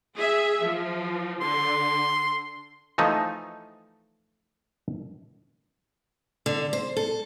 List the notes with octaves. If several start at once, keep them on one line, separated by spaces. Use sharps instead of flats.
G#4 E5
F3
D3 C6
E3 F3 A3 D#4
D3
C5
A4